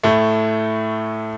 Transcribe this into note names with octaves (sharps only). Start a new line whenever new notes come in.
A2 A3 E4